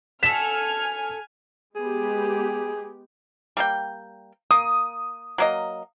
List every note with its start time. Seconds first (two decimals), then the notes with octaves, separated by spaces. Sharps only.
0.23 F#4 A4 G#5 F6 B6 E7
1.76 G#3 B3 G4 G#4
3.57 G3 A#3 G5
4.51 A#3 D#6
5.38 F#3 A#3 D#5